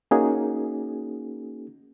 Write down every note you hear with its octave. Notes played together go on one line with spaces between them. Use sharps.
A#3 C#4 D#4 F#4 G#4